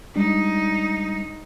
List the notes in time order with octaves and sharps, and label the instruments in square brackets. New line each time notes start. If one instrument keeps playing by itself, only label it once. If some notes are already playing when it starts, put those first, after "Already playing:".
[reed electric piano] G3 G#3 D4 [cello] D#4